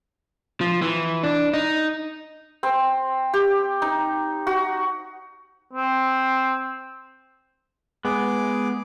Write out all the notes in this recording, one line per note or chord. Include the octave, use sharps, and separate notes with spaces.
F3
E3
D4
D#4
C4
G4
D#4
F#4
C4
G#3 B3 G#4 D6